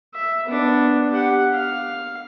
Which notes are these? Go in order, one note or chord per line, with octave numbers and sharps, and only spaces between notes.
E5
B3 D4
G4 F#5
F5